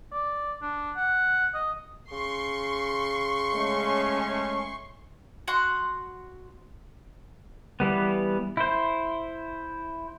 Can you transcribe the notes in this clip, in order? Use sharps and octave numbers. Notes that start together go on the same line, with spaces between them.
D5
D4
F#5
D#5
C#3 C6 C#6
G#3 A3 C#4
F#4 F#5 C6
E3 G3 B3
E4 C5